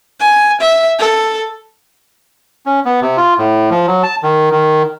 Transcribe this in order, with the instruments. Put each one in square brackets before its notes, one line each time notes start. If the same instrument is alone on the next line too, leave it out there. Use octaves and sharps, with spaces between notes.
[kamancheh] G#5
E5
A4
[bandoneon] C#4
B3
C3
F4
A2
F3
F#3
A5
D#3
D#3